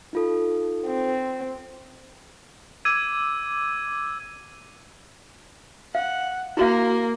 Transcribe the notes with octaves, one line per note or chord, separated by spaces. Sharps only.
D#4 F4 A4
C4
D6 E6 G#6 D#7
F5 F#5
A#3 E4 F#4 F5